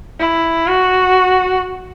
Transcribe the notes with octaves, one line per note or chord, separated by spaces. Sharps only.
E4
F#4